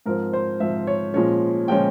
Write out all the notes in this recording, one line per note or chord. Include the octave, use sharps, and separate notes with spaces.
G#2 F3 C4 A#4
C5
G#2 F3 C4 E5
C#5
A#2 F3 G#3 C#4 C#5
A#2 F3 G#3 C#4 G5